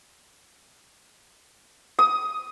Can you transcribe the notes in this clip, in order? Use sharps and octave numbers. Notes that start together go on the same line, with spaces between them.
D#6